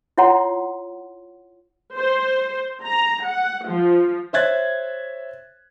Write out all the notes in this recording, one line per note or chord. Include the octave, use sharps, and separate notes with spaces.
E4 F4 C#5 F#5 C6
C5
A#5
F#5
F3
C5 C#5 E5 F#6 G#6 A6